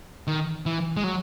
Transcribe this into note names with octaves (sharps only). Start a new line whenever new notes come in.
D#3
E3
G#3
F#3